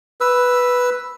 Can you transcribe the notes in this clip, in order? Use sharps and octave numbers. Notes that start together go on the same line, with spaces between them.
B4 E6